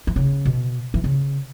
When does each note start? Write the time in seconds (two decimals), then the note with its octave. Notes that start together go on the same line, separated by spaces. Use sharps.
0.07 E3
0.16 C#3
0.45 B2
0.94 E3
1.04 C#3